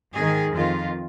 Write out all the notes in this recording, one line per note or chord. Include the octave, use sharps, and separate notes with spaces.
G#2 D#3 G#4
F2 D#3 F4